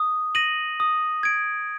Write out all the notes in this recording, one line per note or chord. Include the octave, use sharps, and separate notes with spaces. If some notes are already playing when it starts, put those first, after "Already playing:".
Already playing: D#6
A#6 D#7 F#7
D#6
G#6 D7